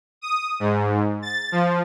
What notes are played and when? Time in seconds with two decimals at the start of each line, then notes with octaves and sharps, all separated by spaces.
0.21 D#6
0.60 G#2
1.22 A6
1.52 F3